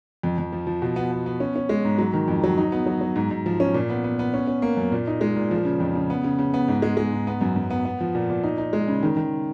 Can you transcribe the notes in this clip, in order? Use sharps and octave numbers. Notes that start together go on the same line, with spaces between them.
F2
F2
F3
F3
B2
B3
B3
B3
C#4
C#4
G#3
G#2
F#3
D#3
F2
F#3
D#4
B3
F#3
F#3
G#2
G#2
F3
C#4
A#2
B3
B3
B3
C#4
C#4
A#3
F#2
A#2
D#4
G#3
A#2
F3
C#3
F2
C#3
B3
C#3
C#3
B3
G#2
G#3
G#3
G#2
B3
F#2
F#2
B3
B3
F3
A#2
A#2
D#4
D#4
G#3
C#3
D#3
D#3